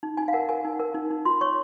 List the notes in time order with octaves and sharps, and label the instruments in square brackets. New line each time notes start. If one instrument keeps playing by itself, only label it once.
[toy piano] D#4
D#4 G#5
F5
A#4 F#5
A#4 G#5
D#4
A#4
D#4
D#4
F4 C6
C#5 C#6